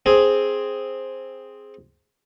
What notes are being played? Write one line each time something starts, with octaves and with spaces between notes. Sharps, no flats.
C4 G#4